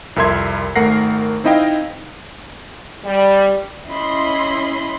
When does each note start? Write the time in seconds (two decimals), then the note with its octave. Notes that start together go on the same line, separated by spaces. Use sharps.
0.16 C2 F2 A#4 E5 C6 G#6
0.76 G#1 A3 A#4 F#5 A#6 C7
1.44 C4 D#4 E4 D#5 F5 G5
3.05 G3
3.87 C#4 E4 D#5 B5 C6